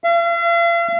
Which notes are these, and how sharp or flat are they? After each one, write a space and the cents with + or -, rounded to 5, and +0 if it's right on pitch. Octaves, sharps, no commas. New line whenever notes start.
F5 -45